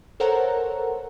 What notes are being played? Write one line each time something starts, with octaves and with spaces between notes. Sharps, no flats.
A4 A#4 C5 C#5 F#5 A#5